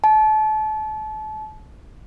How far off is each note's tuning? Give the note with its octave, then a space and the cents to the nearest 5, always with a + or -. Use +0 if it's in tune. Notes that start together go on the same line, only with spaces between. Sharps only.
A5 -30